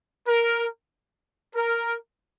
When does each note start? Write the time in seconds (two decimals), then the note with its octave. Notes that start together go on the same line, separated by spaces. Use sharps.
0.27 A#4
1.55 A#4